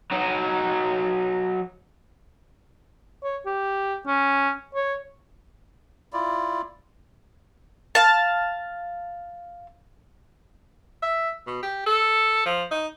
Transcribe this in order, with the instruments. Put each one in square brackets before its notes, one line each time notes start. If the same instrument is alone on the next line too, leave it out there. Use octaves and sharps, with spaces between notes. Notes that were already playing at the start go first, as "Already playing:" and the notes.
[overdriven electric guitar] F#3 D#4
[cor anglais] C#5
G4
C#4
C#5
[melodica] E4 F4 D5
[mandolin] F5 A5
[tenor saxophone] E5
B2
G4
A4
F3
D#4